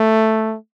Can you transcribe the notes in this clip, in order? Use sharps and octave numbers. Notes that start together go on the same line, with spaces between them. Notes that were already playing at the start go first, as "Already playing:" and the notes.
Already playing: A3